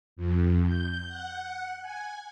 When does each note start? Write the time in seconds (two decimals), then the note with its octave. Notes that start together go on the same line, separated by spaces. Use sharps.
0.16 F2
0.66 G6
1.08 F#5
1.81 G#5